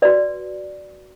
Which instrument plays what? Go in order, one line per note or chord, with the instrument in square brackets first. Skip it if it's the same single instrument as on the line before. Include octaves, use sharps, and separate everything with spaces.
[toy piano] F#4 B4 D5